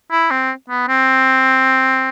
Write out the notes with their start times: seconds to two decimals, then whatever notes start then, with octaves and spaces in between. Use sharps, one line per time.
0.11 E4
0.31 C4
0.70 B3
0.88 C4